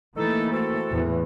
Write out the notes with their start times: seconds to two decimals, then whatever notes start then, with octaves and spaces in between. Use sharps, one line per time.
0.17 E3 A3 A#3 D#4 A4
0.52 C4 F#4 A4
0.91 E2 A2 E3